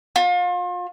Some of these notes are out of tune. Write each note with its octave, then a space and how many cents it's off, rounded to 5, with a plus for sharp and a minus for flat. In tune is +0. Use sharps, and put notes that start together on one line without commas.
F4 +35